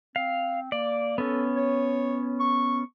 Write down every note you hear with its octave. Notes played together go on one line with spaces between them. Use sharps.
C4 F5
A#3 D5
B3 C#4 A4
C#5
C#6